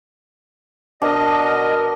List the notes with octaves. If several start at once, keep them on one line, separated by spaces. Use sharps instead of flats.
B2 D4 A#4 D#5